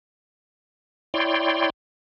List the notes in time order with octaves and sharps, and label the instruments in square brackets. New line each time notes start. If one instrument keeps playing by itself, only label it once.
[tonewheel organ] E4 C#5 D5 G5 C6